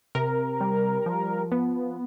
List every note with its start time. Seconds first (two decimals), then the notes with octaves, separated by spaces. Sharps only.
0.15 C3 A#4
0.61 G3
1.06 F3
1.52 B3